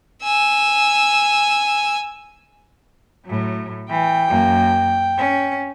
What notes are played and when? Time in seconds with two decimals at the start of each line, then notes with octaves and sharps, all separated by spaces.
0.23 G#5 E6
3.26 A2 F#3
3.90 E3 G5
4.28 F#2 A#3
5.18 C#4